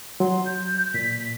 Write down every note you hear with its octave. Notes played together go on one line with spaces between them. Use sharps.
F#3 C6
G6
A#2 B6